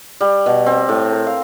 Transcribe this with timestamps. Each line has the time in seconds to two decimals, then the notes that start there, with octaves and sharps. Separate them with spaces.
0.21 G3
0.46 B2
0.66 C4
0.89 A2
1.12 A#4
1.27 F5